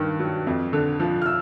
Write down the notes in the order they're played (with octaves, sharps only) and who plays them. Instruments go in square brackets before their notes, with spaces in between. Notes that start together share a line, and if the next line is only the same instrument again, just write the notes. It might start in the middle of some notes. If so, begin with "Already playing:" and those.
Already playing: [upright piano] G2 D#3
F#3
F2
D3
F3
F6
E6